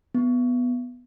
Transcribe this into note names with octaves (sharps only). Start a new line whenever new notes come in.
B3